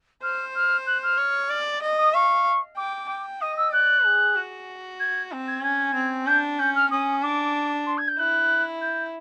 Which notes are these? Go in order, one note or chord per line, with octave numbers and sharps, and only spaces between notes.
C5 F6
F6
F#6
F6
C#5
D5
D#5
D#6
F5 C#6
G5 D6
G5
D#5 D#6
E6
D5 F#6
G#4
F#4
G#6
C4
G#6
C#4 G#6
C4
D4 G6
C#4 G6
F6
C#4 D#6
D4 D6
C6
G#6
G6
E4 F#6
G6